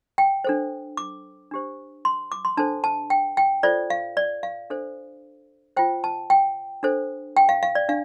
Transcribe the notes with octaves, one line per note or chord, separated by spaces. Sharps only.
G5
D4 A4 C5
D6
D4 G4 C5
C6
D6
C6
D4 A4 C5 A5
A5
G5
G5
F4 A4 C5 D5
F5
D5
F5
D4 A4 C5
F4 C5 G5
A5
G5
D4 A4 C5
G5
F5
F5
D5
D4 F5